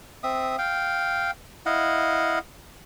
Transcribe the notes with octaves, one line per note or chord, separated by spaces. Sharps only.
C4 E5 D#6
F5 G5
E4 D#5 F5 F#5